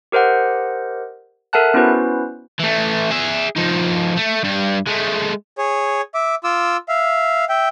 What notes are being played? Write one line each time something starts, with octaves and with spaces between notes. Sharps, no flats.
G4 A#4 C5 D#5 F#5
A4 A#4 E5 F#5 A5 F#6
B3 C#4 E4 F#4 B4 C5
E3 A3
G#4 E5
F3 D#4
A3
G2 G3
G#3 A3
G#4 C#5
E5 D6
F4 D6 E6
E5 F5
E5 G5